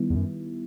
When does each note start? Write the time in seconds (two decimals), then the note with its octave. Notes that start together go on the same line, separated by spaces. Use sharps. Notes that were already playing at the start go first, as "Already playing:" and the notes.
Already playing: D#3 G3 B3 E4
0.10 E2
0.15 F#2